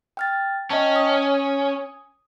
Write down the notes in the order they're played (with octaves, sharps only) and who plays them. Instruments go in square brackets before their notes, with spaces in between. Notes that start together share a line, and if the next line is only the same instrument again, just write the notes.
[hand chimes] G5 F6 A6
[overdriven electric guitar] C#4 [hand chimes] D#5 G5 A5
[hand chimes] D#6